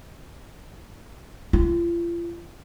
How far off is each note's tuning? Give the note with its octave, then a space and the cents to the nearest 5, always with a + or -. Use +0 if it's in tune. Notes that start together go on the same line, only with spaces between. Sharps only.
F4 -40